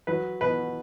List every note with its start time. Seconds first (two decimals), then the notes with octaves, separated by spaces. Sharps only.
0.07 F#3 B4
0.41 B2 B4